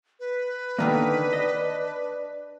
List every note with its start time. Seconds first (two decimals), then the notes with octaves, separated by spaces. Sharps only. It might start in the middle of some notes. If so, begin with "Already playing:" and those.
0.20 B4
0.78 D3 D#3 A#3 D4
1.33 D#5